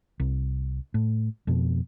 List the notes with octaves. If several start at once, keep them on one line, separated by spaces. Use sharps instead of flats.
C2
A2
F2 B2